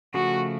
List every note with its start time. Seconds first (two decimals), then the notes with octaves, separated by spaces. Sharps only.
0.14 C#3 F3 A3 F#4